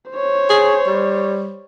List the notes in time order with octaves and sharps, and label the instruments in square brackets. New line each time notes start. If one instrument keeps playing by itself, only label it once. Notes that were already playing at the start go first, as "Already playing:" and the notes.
[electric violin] C5 C#5
[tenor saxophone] G#4
G3